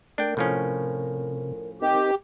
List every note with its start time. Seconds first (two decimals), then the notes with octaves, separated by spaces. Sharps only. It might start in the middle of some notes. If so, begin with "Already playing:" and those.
0.18 A3 D4 A#4 G5
0.37 A2 C3 F3 C#4
1.82 C4 D#4 G4 A#4 D#5